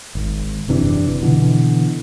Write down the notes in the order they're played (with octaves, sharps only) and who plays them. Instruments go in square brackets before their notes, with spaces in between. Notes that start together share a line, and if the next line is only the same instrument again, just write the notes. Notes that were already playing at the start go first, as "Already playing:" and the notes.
[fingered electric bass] G#1
F#1 C3 E3 D4
B2 D3 E3